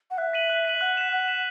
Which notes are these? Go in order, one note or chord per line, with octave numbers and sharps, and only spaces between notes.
F#5
E5 F#6
B6 D#7 F#7
F#6
B6 D#7 F#7
F#5 F#6
B6 E7
F#5 F#6
B6 E7